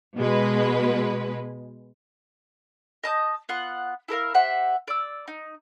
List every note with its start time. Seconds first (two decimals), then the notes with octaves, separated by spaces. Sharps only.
0.17 B2 G#3 B4
3.04 D#5 A5 D#6 G6
3.49 B3 F4 F#5
4.08 E4 A4 A#4 F5
4.34 G4 C5 E5 F#5
4.88 D5 E6
5.28 D#4